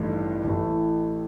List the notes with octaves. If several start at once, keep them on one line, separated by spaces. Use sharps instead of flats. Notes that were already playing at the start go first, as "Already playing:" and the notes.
Already playing: A1 G2 D#3 A3
A1 A2 E3 A3